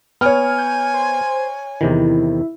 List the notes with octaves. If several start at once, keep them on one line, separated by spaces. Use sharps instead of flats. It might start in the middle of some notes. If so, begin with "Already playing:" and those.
B3 C#5 G#5 F6
G6
C5
E2 C3 D#3 E4